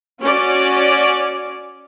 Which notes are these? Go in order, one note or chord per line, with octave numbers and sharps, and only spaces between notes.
C#4 F#4 D5